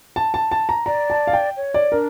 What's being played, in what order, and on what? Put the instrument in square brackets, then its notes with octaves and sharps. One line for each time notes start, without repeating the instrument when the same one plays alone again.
[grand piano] A5
A5
A5
A#5
[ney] D5 [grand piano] A#5
[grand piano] A5
F5
G5
[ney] C#5
[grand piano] D5
[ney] D4 [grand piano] A#4